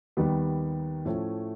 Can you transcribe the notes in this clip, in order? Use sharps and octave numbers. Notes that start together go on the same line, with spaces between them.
D#2 D#3 G3 B3
A2 F3 A3 C#4